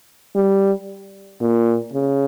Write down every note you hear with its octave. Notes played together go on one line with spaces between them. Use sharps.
G3
A#2
C#3